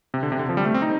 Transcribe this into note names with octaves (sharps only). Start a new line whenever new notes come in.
C3
D3
C3
D3
F3
G3
A3
C4
D#4